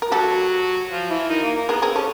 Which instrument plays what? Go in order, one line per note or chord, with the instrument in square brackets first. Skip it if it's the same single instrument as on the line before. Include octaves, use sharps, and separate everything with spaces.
[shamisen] A#4
[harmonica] F#3 F#4 [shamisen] G4 A4
[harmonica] F3 F4
E3 E4
D#3 D#4
A#3
A#3
[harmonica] B3 [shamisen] G#4 A#4
[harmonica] C4 [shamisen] G#4 A#4
[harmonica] C#4 [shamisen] G4 A4